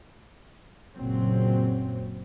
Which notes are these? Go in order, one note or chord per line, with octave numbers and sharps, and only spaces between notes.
F#1 A#2 F#3 C4